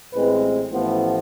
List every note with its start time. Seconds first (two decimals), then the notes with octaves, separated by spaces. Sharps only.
0.13 A1 A2 G#3 C4 B4
0.72 A1 A2 F3 B3 C5